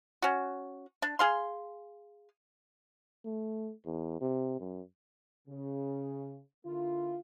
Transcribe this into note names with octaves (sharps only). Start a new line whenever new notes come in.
C#4 F#4
D4
G#4 F5 C6
A3
E2
C3
F#2
C#3
D3 A#3 E4 F4